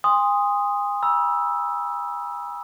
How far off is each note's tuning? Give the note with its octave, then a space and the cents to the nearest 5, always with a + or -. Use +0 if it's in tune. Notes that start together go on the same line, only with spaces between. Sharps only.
G#5 -40 C6 +0 D#6 +0
B5 -40 E6 +0